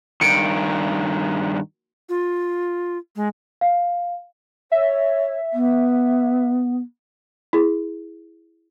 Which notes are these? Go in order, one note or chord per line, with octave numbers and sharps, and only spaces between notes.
G2 D#3 C#7 D7
F4
G#3
F5
C#5 E5
B3
E4 G#4